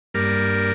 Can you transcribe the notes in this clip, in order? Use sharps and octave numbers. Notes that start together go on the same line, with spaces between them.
G2 G3 A#3 A#4